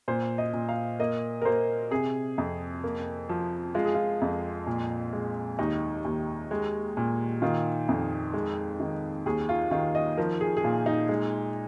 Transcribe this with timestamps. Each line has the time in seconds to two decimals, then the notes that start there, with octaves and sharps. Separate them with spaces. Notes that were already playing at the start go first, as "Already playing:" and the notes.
0.08 A#2 C5
0.38 D#5
0.53 A#2
0.69 F5
1.00 A#3 D#5
1.42 A#4
1.45 A#3 C5
1.91 C3 G#4
2.38 F2
2.84 A#3
3.29 F3
3.74 G#3 F4
3.85 G#4
3.95 F4
4.22 F2
4.67 A#2
5.13 G#3
5.59 D#2 D#4
6.05 D#2
6.51 G#3
6.97 A#2
7.42 D#3 F4
7.89 F2
8.33 G#3
8.80 D#3
9.26 D#2 G#4
9.49 F4
9.71 D#3 F4
9.95 D#5
10.17 F3 A#4
10.41 G#4
10.57 G#4
10.64 A#2 F4
10.86 D#4
11.09 G#3